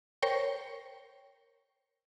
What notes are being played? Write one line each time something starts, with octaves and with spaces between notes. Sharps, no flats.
A#4 C5 C#5 G5 C#6